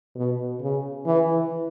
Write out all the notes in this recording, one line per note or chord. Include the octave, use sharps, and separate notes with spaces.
B2
C#3
E3